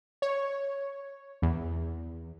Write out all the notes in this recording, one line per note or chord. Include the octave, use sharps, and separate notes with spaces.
C#5
E2